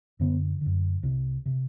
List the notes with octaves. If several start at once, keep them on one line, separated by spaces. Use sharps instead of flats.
F#2 D3 B3
F#2 D3
C2 C3
C3